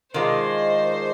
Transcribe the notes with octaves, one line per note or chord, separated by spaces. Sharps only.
D#3 G#3 D4 F4 C5